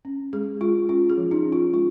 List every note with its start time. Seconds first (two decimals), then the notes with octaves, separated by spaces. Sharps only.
0.05 C#4
0.33 G#3 G#4
0.61 G#3 F4
0.89 C#4 F4
1.10 G#4
1.17 F3
1.31 D#4
1.45 C#4
1.52 F4
1.73 G#3 F4